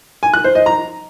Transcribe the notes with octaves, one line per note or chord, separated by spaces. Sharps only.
G#5
F#6
C5
D#5
A#5